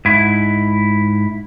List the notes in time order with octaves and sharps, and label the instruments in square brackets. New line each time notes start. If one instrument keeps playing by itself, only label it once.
[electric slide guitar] G#2 E4